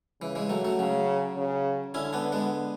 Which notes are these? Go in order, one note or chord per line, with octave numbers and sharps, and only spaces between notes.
C#3 E3
E3 G#3
F#3 A3
F#3 A3
C#3 F#3
C#3
D3 C#4 E4
B3 D4
G#3 B3